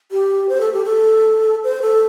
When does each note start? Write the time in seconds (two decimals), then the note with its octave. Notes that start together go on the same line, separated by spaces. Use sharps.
0.12 G4
0.49 C5
0.61 A4
0.73 G4
0.85 A4
1.64 C5
1.82 A4